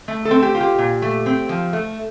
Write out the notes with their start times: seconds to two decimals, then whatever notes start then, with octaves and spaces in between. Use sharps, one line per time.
0.08 A3
0.25 A4
0.31 C4
0.42 G4
0.55 F4
0.60 G4
0.78 A#2
1.02 A3
1.26 C4
1.49 F3
1.73 A3